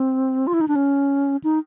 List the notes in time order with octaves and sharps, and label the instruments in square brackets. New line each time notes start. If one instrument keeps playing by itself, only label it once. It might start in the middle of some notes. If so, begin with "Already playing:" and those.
Already playing: [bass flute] C4
F4
E4
D#4
D4
C#4
D#4